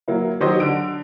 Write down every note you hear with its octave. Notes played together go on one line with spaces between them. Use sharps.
F#3 A#3 E4
D#3 F#3 G4 C5 C#5 D#5
D3 D7